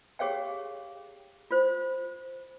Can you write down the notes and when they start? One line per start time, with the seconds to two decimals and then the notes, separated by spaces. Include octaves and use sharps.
0.19 G4 G#4 C#5 F5 G5
1.51 F4 C5